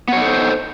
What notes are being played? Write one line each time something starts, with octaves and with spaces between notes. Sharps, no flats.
B3 D#4 A4 C5 C#5